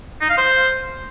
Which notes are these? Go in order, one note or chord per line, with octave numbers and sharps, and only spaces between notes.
D#4
F5
C5